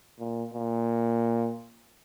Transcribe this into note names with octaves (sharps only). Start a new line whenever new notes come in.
A#2
A#2